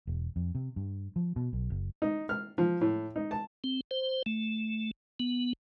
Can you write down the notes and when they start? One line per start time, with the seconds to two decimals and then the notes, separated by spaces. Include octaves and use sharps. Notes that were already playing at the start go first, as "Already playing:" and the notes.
0.07 E1
0.36 F2
0.55 C3
0.76 G2
1.16 F3
1.36 B2
1.53 B1
1.70 F#1
2.02 D#4
2.29 F6
2.58 F3
2.81 A2
3.16 D#4
3.31 A5
3.64 C4
3.91 C5
4.26 A3
5.20 B3